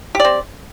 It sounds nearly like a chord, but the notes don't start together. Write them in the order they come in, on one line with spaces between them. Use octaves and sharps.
G4 D5 C4